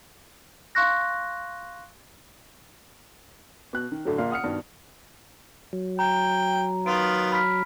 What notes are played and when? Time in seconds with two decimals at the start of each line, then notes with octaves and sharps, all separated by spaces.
0.75 F5 C6 C#6 F#6 A#6
3.73 B2 F#6
3.92 D#3
4.05 A2 D3 F#3
4.18 A#1 A#2 A#4 F5
4.30 F#5 D#6 F6 C#7
4.44 G2 B2 D#3
5.73 F#3
5.99 G5 A#5
6.86 D#3 B3 F4 D7
7.32 B5 F6 B6